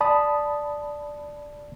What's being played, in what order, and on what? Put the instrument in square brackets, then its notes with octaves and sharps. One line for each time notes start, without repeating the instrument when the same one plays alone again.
[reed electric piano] D5 A5 B5 D#6